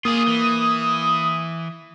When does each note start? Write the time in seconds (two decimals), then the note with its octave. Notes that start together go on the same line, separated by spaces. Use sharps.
0.05 A#3 F4 G#4 D#6
0.28 E3